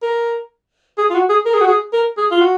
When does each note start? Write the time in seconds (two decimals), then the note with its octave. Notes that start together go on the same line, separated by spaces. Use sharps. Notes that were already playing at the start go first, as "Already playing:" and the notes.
0.03 A#4
0.98 G#4
1.10 F4
1.15 F#4
1.29 G#4
1.46 A#4
1.54 G#4
1.61 F#4
1.68 G#4
1.93 A#4
2.17 G#4
2.31 F4
2.41 F#4